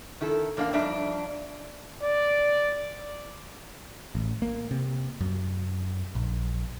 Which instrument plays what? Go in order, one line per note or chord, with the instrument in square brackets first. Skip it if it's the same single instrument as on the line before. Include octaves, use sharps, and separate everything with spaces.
[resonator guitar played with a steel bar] D#3 E4 A4
E2 A#3 D4 D#4 F5
F2 G3 D4 D#4 E5
[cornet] D5
[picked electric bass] A1
A#3
C3
F#2
A#1